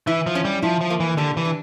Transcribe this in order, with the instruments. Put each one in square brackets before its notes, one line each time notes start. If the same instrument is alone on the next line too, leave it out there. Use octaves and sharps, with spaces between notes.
[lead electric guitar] E3 [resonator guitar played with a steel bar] E4
[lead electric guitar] F3
[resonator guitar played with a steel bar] C#4
[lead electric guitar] G3
[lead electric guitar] F3 [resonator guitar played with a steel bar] E4
[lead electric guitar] F3
[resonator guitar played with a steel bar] A#3
[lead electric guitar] E3
[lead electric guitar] D3 [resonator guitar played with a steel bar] G4
[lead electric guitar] E3
[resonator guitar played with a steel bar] D4